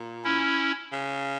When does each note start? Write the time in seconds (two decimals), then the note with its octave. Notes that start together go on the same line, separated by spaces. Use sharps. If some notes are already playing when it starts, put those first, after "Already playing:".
Already playing: A#2
0.24 C#4 E4
0.92 C#3